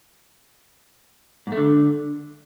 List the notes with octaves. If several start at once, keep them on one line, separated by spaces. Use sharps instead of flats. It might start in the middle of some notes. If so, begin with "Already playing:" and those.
G#2
A3
D3